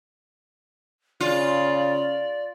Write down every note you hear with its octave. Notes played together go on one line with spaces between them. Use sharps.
C#3 F4 D5